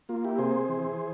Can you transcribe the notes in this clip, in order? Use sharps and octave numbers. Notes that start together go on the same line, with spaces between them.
A#3 F4
E4 G4
C3 G#4 C5
E3